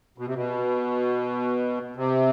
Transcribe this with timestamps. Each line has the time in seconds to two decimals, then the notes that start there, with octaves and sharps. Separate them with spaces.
0.18 B2
0.26 C3
0.35 B2
1.96 C3